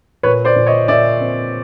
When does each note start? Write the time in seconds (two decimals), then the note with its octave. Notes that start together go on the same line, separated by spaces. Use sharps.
0.23 A#2 B4 C#5
0.45 C5 D5
0.56 A#2
0.67 C#5 D#5
0.88 A#2 D5 E5
1.20 C4